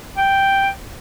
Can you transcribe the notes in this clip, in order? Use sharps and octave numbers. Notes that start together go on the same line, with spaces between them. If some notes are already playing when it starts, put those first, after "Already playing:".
G5